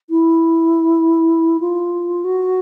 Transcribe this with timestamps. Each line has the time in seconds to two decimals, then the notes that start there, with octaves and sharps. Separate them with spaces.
0.10 E4
1.60 F4
2.24 F#4